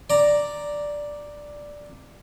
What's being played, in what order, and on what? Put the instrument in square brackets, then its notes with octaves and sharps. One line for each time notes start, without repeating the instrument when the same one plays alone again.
[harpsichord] D5 A#5